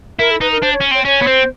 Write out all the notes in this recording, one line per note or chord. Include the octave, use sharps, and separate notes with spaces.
E4 A#4
A4
D#4 B4
A#4
D4 C5
C#5
C#4
C4 C#5
C#4 C#5
B3
C4 C5